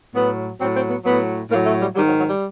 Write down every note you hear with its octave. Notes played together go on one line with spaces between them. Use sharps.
A2 F#3 B3
A2 F#3 C4
C4
B3
A2 F#3 B3
A2 F#3 A#3
A3
G3
G#2 D#3 F#3 G3
F#3
F#3
G3